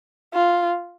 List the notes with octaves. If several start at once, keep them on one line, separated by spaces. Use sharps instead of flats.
F4